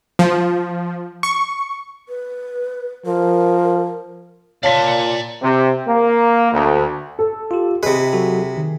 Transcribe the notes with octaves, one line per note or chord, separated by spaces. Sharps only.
F3
C#6
B4
F3 A#4
A#2 C#5 D5 F5 A5 C6 B6
C3
A#3
D2
A4
F4 G4
C3 G#4 B4 D#5
F#3 F#4 A4
D#3